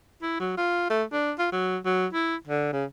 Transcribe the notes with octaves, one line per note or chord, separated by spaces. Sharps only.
E4
F#3
F4
A3
D4
F4
F#3
F#3
E4
D3
C#3